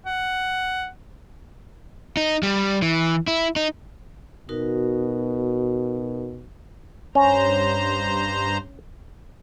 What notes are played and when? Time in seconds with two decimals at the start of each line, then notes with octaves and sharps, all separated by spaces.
0.06 F#5
2.17 D#4
2.43 G3
2.82 E3
3.27 E4
3.56 D#4
4.49 B2 D#4 F#4 A#4
7.15 G2 C#4 C5 A#5